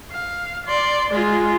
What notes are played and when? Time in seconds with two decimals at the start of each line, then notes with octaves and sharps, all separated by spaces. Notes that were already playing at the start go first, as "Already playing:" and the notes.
0.11 F5
0.66 D5 C6
1.11 G#3 F4